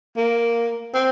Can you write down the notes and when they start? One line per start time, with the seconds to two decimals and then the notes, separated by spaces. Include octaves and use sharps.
0.17 A#3
0.94 C4